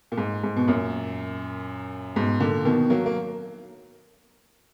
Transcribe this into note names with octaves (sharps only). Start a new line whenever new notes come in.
A#2
G#2
G#2
B2
F#2 A#2
G#2 B2
A#2 D3
B2 D#3
F#3 A#3
A#3